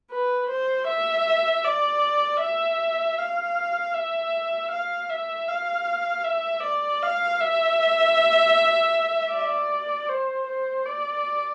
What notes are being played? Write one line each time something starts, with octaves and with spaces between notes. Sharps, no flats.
B4
C5
E5
D5
E5
F5
E5
F5
E5
F5
E5
D5
F5
E5
D5
C5
C5
D5